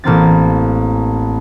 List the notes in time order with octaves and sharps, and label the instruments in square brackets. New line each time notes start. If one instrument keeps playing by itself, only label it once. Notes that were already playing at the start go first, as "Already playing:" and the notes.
[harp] A1 A#3 C4 A6